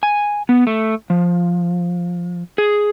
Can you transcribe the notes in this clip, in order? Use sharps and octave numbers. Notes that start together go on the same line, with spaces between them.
G#5
B3
A3
F3
G#4